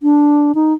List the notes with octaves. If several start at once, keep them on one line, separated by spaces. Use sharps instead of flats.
D4
D#4